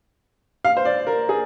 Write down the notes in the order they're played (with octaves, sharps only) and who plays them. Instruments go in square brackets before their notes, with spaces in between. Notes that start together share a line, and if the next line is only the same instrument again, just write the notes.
[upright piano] F5
C5
D5
A#4
G#4